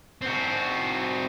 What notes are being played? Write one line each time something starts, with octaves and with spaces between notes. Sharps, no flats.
C4 F#4